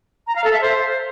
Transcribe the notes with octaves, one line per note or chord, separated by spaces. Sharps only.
A#5
F5
A4
E5
C5